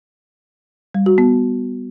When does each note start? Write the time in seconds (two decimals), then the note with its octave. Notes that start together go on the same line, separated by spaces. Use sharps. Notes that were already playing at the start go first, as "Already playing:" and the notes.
0.95 G3
1.06 F#4
1.18 B3